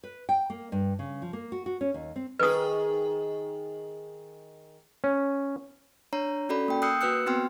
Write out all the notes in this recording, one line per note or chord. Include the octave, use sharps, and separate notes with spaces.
B4
G5
A#3
G2
C#3
F3
A#3
F#4
F#4
C#4
D#2
C4
D#3 G#4 B4 D#6
C#4
D4 C#5 A#5
C#4 F#4 A4 D5 B5
A#3 G5
D#6 E6 F#6 G6 C7 C#7
A#3 F#4 B4 E6 F#6 C#7
B3 C4 F#4 G5 C6 F6